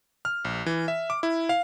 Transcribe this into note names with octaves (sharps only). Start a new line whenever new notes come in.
F6
A#1
E3
E5
D6
E4
F5